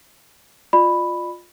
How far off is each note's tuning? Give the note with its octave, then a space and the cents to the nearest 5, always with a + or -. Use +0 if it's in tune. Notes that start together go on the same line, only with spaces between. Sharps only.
F4 +10 D5 +40 B5 +0